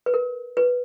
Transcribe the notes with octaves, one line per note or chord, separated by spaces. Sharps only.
B4
A#4
B4